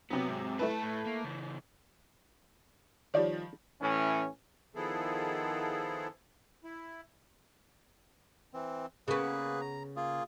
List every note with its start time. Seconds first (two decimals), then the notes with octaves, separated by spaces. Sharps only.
0.10 C3 F#3 B3
0.28 G#2
0.59 A3 E4 B4 E5 A5
0.83 A2
1.06 A#3
1.24 C#3 E3
3.14 D#3 F3 G3 C#5 D5
3.81 A2 E3 C#4
4.75 D#3 F3 B3 E4 G#4 A4
6.64 E4
8.54 E3 C4
9.08 C#3 A#3 B3 G#4 B4
9.61 A#5
9.96 A#3 F4 G#4